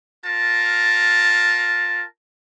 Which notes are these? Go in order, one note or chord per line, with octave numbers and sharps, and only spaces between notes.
F4 A#4 A5